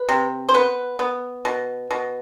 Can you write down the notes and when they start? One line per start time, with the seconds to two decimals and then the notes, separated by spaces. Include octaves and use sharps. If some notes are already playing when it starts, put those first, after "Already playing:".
Already playing: B4
0.09 C3
0.49 C5
0.54 B3 B4
0.99 B3
1.45 B2
1.91 B2